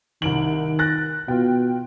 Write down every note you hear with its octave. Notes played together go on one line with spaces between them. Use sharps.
C2 D#3 D7 F#7
F#6 A6 A#6
B2 F4 G5